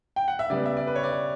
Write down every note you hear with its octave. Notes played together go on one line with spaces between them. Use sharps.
G5
F#5
E5
C#3 G3 B3 D5
E5
D5
B4
C#5
D5